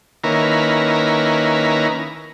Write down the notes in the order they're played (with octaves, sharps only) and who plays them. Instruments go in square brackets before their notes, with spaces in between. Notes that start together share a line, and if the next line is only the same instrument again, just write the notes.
[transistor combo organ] D#3 A#3 C#4 E4 A#4 B4